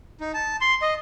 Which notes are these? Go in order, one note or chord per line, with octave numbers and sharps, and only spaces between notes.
D#4
A5
C6
D#5